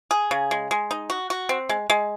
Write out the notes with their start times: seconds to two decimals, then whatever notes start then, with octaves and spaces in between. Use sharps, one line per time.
0.11 G#4
0.31 C#3
0.51 G#3
0.71 G#3
0.91 D#4
1.10 F#4
1.30 F#4
1.49 C4
1.69 G#3
1.90 G#3